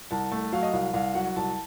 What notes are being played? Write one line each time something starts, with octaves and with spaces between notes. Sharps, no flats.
C2 A5
A3 A5
F#3 F5
D#5
C2 F5
C2 F5
F#3 F#5
C2 A5